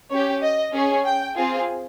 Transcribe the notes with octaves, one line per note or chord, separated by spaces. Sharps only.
C#4 G4 C#5
D#5
C#4 G#4
G5
C4 F4 G#4